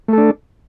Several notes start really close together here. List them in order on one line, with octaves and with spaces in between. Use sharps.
A3 A4 D4